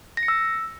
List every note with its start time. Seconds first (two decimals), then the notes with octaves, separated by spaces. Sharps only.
0.17 A#6
0.23 C#7
0.28 E6